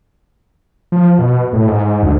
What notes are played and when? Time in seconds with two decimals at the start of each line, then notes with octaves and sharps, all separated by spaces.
0.92 F3
1.19 B2
1.53 A2
1.68 G#2
2.02 D2